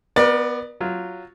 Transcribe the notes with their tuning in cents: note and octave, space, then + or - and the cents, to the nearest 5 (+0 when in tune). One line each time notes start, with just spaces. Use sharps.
B3 +5 A#4 +45 D5 +25
F#3 +0 F4 +0